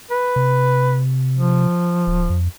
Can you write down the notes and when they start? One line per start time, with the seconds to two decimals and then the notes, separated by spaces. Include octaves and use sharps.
0.11 B4
0.36 C3
1.36 F3
2.07 D1
2.30 F2